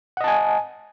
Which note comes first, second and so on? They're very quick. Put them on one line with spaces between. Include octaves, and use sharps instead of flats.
F#5 D#5 A5 G#5